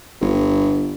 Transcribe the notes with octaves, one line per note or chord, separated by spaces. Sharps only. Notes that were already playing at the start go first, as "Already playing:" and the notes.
G1